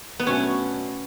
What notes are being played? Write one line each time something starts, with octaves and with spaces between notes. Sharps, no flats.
B3
B2 F#3 A3 C#4 D4